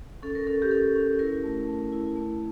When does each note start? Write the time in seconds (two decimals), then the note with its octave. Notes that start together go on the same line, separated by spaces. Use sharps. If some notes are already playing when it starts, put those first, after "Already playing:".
0.23 C#4 A4
0.35 A#4
0.47 C#4 A4
0.62 G4
0.71 C#4 A4
0.96 C#4
1.19 E4 A#4
1.44 A3
1.68 A3
1.93 E4
2.16 A3